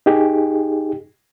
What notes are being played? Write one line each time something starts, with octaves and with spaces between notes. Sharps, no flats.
D#4 G4 G#4